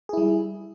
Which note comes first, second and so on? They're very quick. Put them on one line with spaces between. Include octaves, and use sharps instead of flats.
G#4 E4 G3